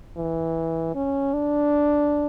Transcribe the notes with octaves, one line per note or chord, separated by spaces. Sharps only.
E3
C#4
D4